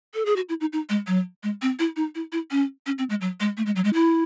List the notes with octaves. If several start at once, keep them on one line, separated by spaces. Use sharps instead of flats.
A4
G#4
F#4
E4
D#4
D#4
G#3
F#3
G#3
C4
E4
D#4
E4
E4
C#4
C#4
C4
G#3
F#3
G#3
A3
G#3
F#3
G#3
E4